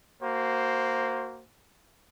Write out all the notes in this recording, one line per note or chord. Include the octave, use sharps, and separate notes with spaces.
A#3 F#4 C5